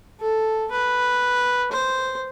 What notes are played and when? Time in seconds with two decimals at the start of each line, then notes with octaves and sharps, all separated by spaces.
0.21 A4
0.71 B4
1.72 C5